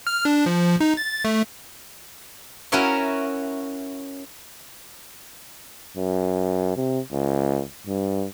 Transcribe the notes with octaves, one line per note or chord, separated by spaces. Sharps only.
F6
D4
F3
D#4
A6
A3
C#4 E4 F#4 A#4 C#5 E5
F#2
C3
C#2
G2